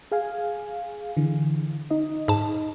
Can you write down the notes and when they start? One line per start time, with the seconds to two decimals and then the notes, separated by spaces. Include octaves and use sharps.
0.12 G#4 F5 G#5
1.17 D3 E3
1.91 D#4 D#5
2.28 G#2 A5